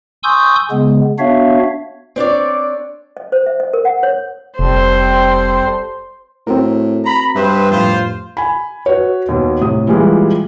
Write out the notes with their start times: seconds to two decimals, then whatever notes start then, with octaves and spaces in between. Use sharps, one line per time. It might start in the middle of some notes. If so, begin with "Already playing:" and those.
0.23 G#5 C6 C#6 D#6 E6 G6
0.71 C#3 G#3 B3
1.19 B3 D4 F#4 C#5 E5 F5
2.16 C4 D4 C#5 D5
3.17 D#5
3.32 C5
3.46 E5
3.60 D#5
3.74 A#4
3.85 F#5
4.03 C#5
4.59 F1 G3 C4 A4 C5
6.47 A2 C4 F#4 A#4
7.05 A#5 B5
7.35 G2 B4 C5 E5
7.71 F2 A2 F4 C5
8.37 G#5 B5
8.86 F#4 B4 C#5
9.29 D#2 B2
9.61 A2 C3 D#6
9.87 A#2 E3 G3 G#3